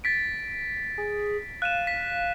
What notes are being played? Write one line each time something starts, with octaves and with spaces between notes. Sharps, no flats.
A6 B6 D7
G#4
F5 F#6 D#7 E7
B6